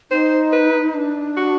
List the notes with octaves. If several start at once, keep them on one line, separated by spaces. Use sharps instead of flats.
D#4 C5
B4
D4
F#4